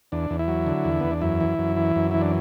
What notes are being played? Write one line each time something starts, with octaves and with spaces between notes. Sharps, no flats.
E2 D4
E2
E4
F#3
D3
E2
E2 B3
D4
F#2 E4
E3
F#2
E3
F#2
E3 E4
D4